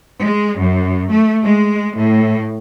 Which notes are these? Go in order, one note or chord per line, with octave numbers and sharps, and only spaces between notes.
G#3
F#2
A3
G#3
A2